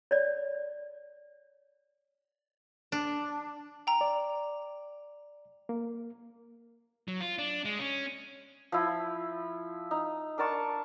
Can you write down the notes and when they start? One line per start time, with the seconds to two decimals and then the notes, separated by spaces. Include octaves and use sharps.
0.11 C#5 D5
2.92 D4
3.87 G5 A#5
4.01 D5
5.69 A#3
7.08 F#3
7.21 F4
7.38 D4
7.65 G#3
7.79 C#4
8.72 F3 E4
9.91 D#4
10.38 D4 A#4 A5 C#6